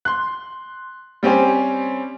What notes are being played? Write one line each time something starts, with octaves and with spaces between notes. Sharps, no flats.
C6 F#6
G3 C4 C#4 G4 C5